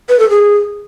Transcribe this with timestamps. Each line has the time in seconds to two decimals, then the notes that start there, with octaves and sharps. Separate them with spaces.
0.09 B4
0.19 A4
0.30 G#4